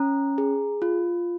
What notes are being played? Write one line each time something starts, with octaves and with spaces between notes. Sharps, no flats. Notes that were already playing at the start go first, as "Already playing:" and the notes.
Already playing: C#4 A#5
G#4
F4